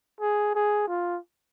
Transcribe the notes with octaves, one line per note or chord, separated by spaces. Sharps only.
G#4
G#4
F4